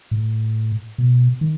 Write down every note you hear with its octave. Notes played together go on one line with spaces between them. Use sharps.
A2
B2
D#3